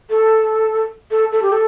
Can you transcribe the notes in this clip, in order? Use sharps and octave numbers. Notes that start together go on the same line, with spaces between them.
A4
A4
A4
G4
A4